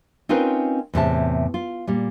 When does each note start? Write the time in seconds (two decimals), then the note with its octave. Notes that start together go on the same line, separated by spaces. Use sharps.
0.29 C4 C#4 D#4 F4 A#4 B4
0.94 E2 A2 C3 A5
1.54 F4
1.87 A#2 G3